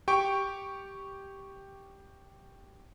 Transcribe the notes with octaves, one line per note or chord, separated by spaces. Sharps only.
G4 G5 C#6 D7